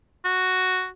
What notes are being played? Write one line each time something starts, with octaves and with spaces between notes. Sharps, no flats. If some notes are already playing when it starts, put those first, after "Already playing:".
F#4